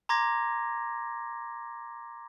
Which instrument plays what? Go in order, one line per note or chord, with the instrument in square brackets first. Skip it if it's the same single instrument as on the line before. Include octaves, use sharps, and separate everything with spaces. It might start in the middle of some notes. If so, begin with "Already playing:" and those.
[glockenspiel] A#5 C6 D6 G#6 A#6